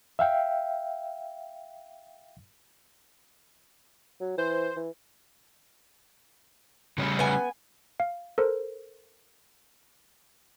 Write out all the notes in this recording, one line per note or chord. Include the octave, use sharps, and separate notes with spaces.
E5 F5 G5
F#3
E3 C5
E3
C#3 G3 C#4
B3 G#5
F5
A4 A#4 C5